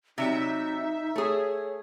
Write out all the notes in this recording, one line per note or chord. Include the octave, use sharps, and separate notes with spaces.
C3 F#3 G3 D#4 E5
A3 G#4 C#5